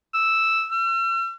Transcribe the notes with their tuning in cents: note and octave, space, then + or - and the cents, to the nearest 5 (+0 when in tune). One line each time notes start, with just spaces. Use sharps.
E6 +0
E6 +45